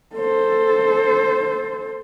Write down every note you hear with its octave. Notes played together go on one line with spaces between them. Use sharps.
A4 C5